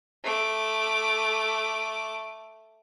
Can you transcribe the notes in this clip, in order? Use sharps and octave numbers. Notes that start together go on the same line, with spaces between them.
A3 D6